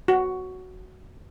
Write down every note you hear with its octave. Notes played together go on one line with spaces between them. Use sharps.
F#4